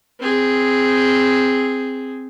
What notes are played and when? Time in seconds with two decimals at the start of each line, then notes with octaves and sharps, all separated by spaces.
0.20 C4 G#4